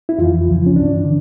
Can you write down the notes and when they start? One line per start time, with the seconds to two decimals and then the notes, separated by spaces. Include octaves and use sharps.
0.09 E4
0.18 F2 E3 F4
0.48 C#2 C#3 F3
0.66 C#4
0.76 G2 E3 D4
1.05 D3